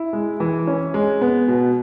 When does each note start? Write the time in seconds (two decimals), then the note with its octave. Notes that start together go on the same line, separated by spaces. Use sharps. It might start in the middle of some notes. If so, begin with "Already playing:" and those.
Already playing: E4
0.13 G#3
0.40 E3
0.67 C#4
0.94 G#3
1.21 B3
1.48 B2